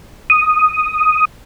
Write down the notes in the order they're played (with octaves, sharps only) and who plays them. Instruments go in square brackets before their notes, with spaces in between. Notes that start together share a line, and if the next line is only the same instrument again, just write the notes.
[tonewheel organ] D#6